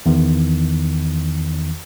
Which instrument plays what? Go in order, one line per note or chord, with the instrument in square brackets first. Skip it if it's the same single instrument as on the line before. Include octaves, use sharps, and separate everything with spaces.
[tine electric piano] E2 D#3